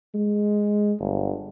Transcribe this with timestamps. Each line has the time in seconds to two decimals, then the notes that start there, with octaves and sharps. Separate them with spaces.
0.15 G#3
1.00 G1